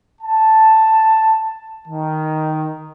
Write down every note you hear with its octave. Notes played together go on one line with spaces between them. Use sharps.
A5
D#3